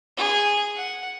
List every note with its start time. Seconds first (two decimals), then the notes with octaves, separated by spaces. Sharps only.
0.17 G#4
0.76 F#5